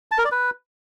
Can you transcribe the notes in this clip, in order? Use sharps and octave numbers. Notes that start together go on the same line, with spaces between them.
A5
A#4
D5
B4